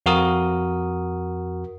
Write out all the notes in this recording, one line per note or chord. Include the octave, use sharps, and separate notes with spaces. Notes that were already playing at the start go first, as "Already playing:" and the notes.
F2 F#4 A#4 D#6